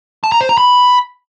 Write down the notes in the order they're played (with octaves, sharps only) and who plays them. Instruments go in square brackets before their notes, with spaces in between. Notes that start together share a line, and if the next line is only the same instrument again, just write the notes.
[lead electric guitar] A5
A#5
C5
A#5
B5